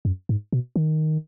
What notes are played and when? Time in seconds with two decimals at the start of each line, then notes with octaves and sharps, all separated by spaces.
0.05 F#2
0.29 G#2
0.53 B2
0.76 D#3